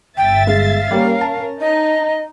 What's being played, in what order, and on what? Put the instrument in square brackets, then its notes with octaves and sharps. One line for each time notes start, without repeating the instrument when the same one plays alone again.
[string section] G1 E5 A6 [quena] G5
[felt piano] G#3 [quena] F5
[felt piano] G3 A#3 [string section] C#4 A#4
[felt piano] A5
[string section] D#4 [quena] D#5